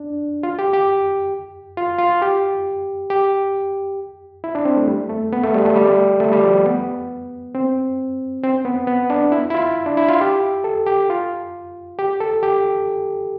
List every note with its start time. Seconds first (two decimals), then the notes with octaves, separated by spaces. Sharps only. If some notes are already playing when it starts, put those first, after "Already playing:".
Already playing: D4
0.43 F4
0.59 G4
0.73 G4
1.77 F4
1.98 F4
2.22 G4
3.10 G4
4.44 E4
4.55 D4
4.65 C4
4.77 A3
4.88 G3
5.10 A3
5.33 B3
5.44 A3
5.54 G3
5.65 A3
5.76 G3
5.85 A3
6.20 A3
6.32 G3
6.43 F3
6.66 B3
7.55 C4
8.43 C4
8.65 B3
8.87 B3
9.10 D4
9.32 E4
9.50 E4
9.54 F4
9.86 D4
9.97 E4
10.08 F4
10.21 G4
10.64 A4
10.87 G4
11.10 F4
11.99 G4
12.21 A4
12.43 G4